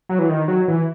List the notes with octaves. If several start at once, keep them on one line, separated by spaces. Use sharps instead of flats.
F#3
E3
D#3
F#3
E3